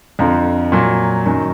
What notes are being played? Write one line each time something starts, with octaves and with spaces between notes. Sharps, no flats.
F2 D3 F3 A#5
A#2 F#3
F#2 D#3 F#3